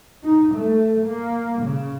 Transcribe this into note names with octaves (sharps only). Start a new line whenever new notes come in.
D#4
A3
A#3
C#3